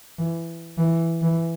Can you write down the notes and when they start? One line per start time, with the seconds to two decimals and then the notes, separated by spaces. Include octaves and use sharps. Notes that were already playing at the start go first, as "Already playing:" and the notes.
0.19 E3
0.78 E3
1.22 E3